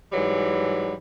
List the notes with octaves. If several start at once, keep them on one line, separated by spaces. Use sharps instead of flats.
G#2 E3 F#3 G3